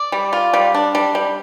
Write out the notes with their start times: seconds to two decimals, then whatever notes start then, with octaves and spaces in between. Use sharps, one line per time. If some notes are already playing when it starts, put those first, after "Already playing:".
Already playing: D5
0.12 G3
0.33 F4
0.54 G3
0.74 D4
0.95 G3
1.15 G3